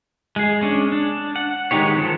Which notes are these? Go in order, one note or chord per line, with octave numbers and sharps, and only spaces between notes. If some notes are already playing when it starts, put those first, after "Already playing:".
G#3 G#4
G#3 C#4 D4
D4
F#5
D#3 G#3 D#4 G4 C#5
D#3 F3 A4